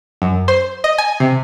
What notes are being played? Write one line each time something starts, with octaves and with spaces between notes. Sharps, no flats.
F#2
C5
D#5
G#5
C3